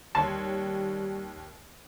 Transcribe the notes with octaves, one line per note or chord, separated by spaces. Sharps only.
D#2 G3 C#5 A5 C6